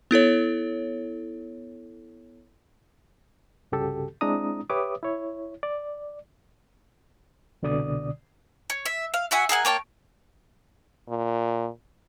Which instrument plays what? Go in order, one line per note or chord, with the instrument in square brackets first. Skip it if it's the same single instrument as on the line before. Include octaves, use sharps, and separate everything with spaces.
[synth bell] B3 E4 A4 C#5
[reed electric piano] C2 G2 C#3 F#4 G4 A4
G#3 C4 D4 E4 A#5 D#6
G4 B4 C#5 E5 D6 D#6
E4 C#5
D5
C2 B2 D3 D5 D#6
[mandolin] C#5
E5
F5
F#4 E5 F#5 G#5
G#4 A#4 F#5 G#5
A#3 C#5 G5 A5
[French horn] A#2